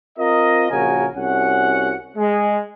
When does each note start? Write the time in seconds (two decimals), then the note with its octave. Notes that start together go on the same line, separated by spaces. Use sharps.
0.18 C4 F4 A#4 D#5
0.71 A#1 C#3 F#4 A#4 G#5
1.16 C2 C#4 F#4 F#5
2.17 G#3